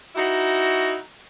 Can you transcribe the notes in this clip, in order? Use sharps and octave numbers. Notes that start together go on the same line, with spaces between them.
D#4 E4 F#4